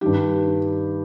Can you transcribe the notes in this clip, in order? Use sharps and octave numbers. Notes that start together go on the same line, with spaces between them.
G2 D#3 G3 G4